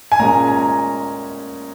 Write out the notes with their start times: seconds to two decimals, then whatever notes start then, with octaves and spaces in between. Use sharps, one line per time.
0.12 G#5
0.19 A#2 G#3 C#4 A#5
0.48 G#5
0.56 A#5